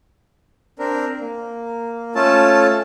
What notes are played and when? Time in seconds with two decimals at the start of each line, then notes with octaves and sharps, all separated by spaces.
0.79 C4 D4 A#4
1.21 A#3
2.15 A3 C#4 F4 A4 A5